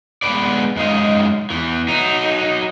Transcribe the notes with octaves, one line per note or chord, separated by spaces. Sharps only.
G#3 B3 D#4 B4 D5
F#2 G#3 D#4 D#5 F5
E2 E3
F#3 D#4